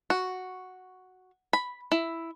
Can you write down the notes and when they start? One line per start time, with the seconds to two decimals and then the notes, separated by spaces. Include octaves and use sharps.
0.10 F#4
1.53 B5
1.92 E4